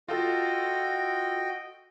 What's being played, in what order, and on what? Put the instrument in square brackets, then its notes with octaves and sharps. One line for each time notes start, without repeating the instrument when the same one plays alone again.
[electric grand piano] F4 A4 [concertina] F#4 D#5 G5